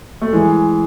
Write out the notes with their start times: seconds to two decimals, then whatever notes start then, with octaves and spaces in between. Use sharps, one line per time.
0.22 A3
0.33 E3 G#3